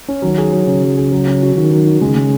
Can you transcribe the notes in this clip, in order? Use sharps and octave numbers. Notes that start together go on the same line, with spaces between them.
C#4
D#3 F#3
G#4
F#3
C#3 C#4
F#3
G#4
F#3
C#4
F#4
D#3 F#4
F#3
F#4
C#3 G#3
G#3